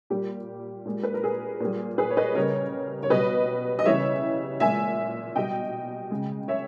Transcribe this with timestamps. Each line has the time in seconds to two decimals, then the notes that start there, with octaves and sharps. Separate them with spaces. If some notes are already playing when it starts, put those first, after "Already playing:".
0.10 A#2 G3 G4
0.86 A#2 G#3
1.03 B4
1.14 A#4
1.24 G#4
1.60 A#2 G3
1.98 G#4 B4
2.10 C#5
2.17 B4 D#5
2.35 C#3 G3 A#4 C#5
3.03 C#5
3.10 B2 G3 B4 D#5
3.79 D#5
3.85 C#3 E3 G3 C#5 E5
4.60 A#2 G#3 E5 G#5
5.36 B2 G3 D#5 G5
6.11 C#3 G#3
6.48 C#5 E5